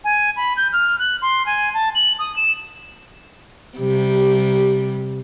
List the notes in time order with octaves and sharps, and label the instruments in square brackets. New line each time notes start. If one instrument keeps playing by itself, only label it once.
[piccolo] G#5
B5
G6
F6
F#6
C6
G#5
A5
F#7
D#6
E7
[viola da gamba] C3 G3